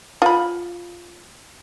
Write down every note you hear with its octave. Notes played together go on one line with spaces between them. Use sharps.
F4 B5